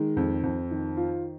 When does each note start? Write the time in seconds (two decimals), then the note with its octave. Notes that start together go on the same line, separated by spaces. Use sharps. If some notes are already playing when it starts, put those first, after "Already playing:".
Already playing: D#3 G#3
0.17 F2
0.43 F2
0.71 D#3
0.97 F4